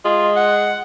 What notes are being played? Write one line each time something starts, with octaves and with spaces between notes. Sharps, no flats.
G#3 F4
F#5